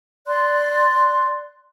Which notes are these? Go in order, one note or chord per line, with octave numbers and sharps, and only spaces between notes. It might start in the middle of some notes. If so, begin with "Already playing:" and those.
D5 C6 F#6